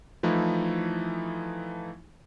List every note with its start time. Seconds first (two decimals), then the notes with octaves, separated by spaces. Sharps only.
0.23 E3 F3 A3 D#4 E4